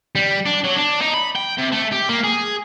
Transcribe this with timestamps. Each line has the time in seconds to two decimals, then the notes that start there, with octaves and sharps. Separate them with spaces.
0.15 G3
0.46 D4
0.64 F#3
0.76 D4
1.01 D#4
1.14 B5
1.36 G5
1.58 C3
1.72 A3
1.92 G4
2.09 A#3
2.24 G#4